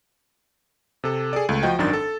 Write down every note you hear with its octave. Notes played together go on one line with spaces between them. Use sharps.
C3 A4
G#4 A4 D5
C#2 A3
F3 F#4 D#5 G5
G#1 F#2 D#3 D4 A6
A4